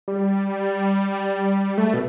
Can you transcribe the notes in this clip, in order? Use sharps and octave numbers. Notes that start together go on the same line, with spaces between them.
G3
A3
B2